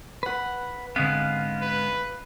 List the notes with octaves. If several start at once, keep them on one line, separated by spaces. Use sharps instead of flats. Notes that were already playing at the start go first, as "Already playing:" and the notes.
B4 F#5
G#2 D3 G#3 B3 C4 F5
B4